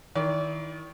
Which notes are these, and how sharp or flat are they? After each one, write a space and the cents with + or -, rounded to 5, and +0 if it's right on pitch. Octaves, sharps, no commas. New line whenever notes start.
D#3 +15 E4 +0 D5 -35